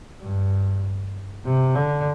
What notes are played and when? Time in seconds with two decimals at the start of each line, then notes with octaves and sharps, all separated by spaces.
0.21 G2
1.45 C3
1.75 D3